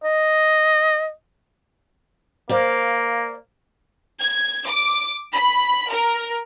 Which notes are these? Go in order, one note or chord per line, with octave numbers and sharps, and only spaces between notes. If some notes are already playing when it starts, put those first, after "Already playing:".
D#5
A#3 C5 D5 F5
G#6
D6
B5
A#4